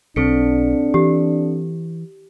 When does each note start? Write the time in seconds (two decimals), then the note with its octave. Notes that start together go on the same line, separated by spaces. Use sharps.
0.16 B1 C4 D4 A4 C#7
0.94 E3 G4